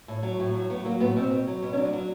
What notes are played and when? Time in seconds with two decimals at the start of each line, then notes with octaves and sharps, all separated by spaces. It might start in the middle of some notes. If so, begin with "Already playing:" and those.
0.08 A2
0.23 F#3
0.39 A2
0.54 F#3
0.70 F#3 B3
0.85 F#3 A#3
1.00 A2 B3
1.16 B2 C4
1.31 B2
1.47 F#3
1.62 B2
1.73 C#4
1.77 F#3 D4
1.93 F#3